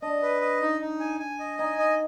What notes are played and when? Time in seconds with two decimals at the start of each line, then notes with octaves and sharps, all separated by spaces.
0.02 D4 D#5
0.23 B4
0.42 D#5
0.62 D#4
0.81 D#4
1.00 G#5
1.20 G#5
1.40 D#5
1.59 D#4 G#5
1.78 D#5